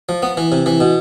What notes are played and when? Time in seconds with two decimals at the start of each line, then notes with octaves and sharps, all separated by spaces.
0.09 F3
0.22 B3
0.37 E3
0.52 C3
0.66 E3
0.80 B2